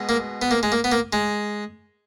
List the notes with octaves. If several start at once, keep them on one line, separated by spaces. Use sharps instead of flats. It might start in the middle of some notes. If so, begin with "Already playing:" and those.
Already playing: B2 G#3
A#3
B3
A#3
G#3
A#3
B3
A#3
G#3